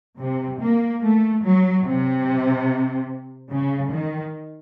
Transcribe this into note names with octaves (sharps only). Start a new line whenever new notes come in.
C3
A#3
A3
F#3
C3
C#3
D#3